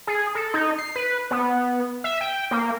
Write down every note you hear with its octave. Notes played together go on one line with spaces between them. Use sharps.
G#4
A4
D#4
C7
B4
B3
E5
G5
A#3